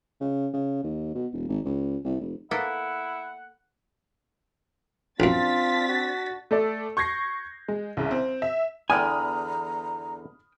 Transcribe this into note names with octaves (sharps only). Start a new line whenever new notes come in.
C#3
C#3
D#2
B2
E1
G#1
C#2
C2
F1
A#3 B3 E4 A4 F#5
A#1 F#2 C4 D4 F4 A6 B6
F#4
A3 A4 D5
C#6 G6 G#6 A#6 C7
G#3
C2 C#3
C4
E5
E2 D3 G5 G#5 A#5 B5 D#6 F6